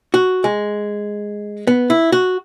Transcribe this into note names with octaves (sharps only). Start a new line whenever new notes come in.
F#4
G#3
B3
E4
F#4